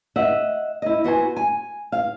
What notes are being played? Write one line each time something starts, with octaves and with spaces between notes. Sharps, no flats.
D#5 E5 F#5
E4 D#5
B3 F#4 C5 G#5
G#5
F5